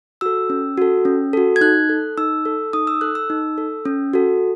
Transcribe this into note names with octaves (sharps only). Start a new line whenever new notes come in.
F#4 A4 E6
C#4
F#4 A4
C#4
F#4 A4
G#6
D#4 F#6
A4
D#4 E6
A4
D#4 D#6
E6
A4 F#6
E6
D#4
A4
C#4
F#4 A4